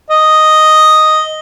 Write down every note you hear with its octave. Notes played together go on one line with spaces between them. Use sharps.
D#5